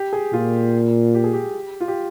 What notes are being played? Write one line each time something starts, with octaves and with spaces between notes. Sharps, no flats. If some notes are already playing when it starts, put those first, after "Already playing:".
Already playing: G4
G#4
A#2 F4
G4
G#4
G4
F4
G4